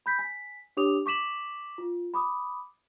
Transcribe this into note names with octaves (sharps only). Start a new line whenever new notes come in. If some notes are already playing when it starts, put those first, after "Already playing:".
B5 G6 B6
G#5 B6
D4 G4 C#5 D6 D#6 F7
C#6 D6 B6 E7 F#7
F4
B5 D6 D#6